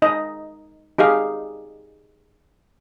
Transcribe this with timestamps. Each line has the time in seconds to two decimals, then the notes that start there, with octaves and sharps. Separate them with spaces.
0.02 D#4 D#5
0.98 D#4 G4 G#4 F5